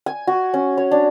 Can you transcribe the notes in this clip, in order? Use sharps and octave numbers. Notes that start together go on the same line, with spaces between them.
G#5
F#4
C#4
C#5
D4